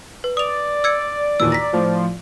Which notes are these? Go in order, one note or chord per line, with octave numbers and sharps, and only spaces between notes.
B4
D5 D#6 F7
E6 G#6 C#7
D#2 A#2 E3 E6
A#5 A#6 B6
A2 F3